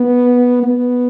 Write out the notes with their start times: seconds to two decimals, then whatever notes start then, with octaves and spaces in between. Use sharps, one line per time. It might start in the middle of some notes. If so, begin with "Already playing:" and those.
Already playing: B3
0.63 B3